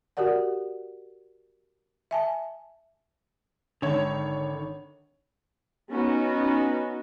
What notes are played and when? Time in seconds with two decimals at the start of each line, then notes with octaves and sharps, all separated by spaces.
0.17 F#4 G4 A#4 D5 F#5
2.11 E5 G#5 A5
3.82 G#1 D3 D#3 C#5
5.92 B3 C#4 D#4 F#4